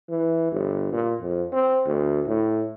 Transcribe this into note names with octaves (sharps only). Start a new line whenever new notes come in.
E3
G1
A#2
F2
C4
D2
A2